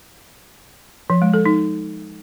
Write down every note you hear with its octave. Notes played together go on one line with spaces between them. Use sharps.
F3
G#3
A4
D#4